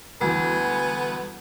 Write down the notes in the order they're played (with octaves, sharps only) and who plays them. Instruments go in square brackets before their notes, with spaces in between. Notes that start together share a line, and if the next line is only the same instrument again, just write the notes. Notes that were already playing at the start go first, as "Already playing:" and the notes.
[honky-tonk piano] D2 E3 [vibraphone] G3 [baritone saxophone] B3 [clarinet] G#5